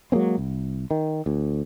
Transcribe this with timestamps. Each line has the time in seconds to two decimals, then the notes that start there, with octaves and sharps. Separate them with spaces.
0.12 F#3 G#3 A#3 C4
0.38 C2
0.91 D#3
1.26 D2